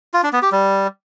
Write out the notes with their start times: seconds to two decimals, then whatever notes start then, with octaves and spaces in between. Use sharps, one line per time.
0.14 F4
0.23 D4
0.33 B3
0.42 G4
0.52 G3